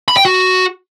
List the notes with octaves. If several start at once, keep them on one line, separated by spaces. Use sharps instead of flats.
B5
G5
F#4